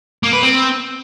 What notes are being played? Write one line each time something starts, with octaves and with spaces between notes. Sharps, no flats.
A#3
B4
C4